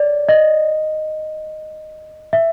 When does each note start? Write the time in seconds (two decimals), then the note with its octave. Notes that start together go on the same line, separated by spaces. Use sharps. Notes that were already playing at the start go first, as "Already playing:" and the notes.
Already playing: C#5 D5
0.29 D#5
2.33 E5